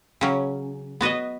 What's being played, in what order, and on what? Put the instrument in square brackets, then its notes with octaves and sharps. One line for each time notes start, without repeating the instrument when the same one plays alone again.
[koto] C#3 F#3 C#4
B3 F#4 B4 D#5